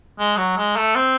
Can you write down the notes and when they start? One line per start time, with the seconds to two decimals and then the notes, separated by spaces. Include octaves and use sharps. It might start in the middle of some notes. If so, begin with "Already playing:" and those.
0.19 G#3
0.37 F#3
0.57 G#3
0.76 A3
0.95 C4